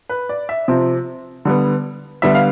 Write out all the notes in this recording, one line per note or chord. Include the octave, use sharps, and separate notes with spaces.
B4
D5
E5
C3 F3 C4
D3 G3 B3
D3 G3 B3 E5
F5